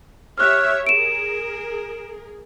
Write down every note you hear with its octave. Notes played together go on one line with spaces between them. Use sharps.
G4 C#5 E5 F6 F#6
G#4 A#4 D7 E7